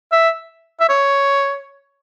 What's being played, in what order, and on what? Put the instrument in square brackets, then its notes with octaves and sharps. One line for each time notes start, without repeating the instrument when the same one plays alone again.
[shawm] E5
E5
C#5